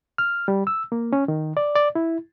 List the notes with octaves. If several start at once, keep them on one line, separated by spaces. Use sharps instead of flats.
F6
G3
E6
A#3
C#4
D#3
D5
D5
E4